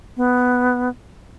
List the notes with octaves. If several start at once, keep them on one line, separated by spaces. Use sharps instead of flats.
B3